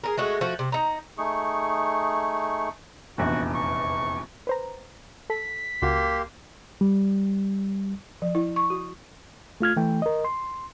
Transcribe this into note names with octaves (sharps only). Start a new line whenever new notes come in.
G#4 A#4
G#3 A3 F#4
F3 A3 F#4
C3
D#4 A#5
A3 D#4 G#4 C#6
F1 A#1 E2 F#4
C#6
B4 C5 A#5
A4 B6
C#2 A#3 F#4 G4 C6
G3
F3
E4
C#6
F#4
A3 F4 F6 G#6
E3 A3 G5
A#4 D#5
C6